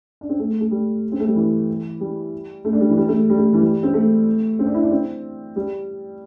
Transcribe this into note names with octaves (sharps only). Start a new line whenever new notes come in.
D4
C4
A3
A3
G3
C4
A3
G3
E3
G3
A3
D4
G3
E3
G3
A3
G3
A3
E3
G3
C4
A3
C4
D4
E4
D4
C4
G3